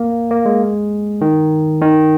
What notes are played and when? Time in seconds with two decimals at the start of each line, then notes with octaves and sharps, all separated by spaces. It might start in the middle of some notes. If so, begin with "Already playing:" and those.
Already playing: A#3
0.31 A#3
0.46 G#3
1.21 D#3
1.82 D#3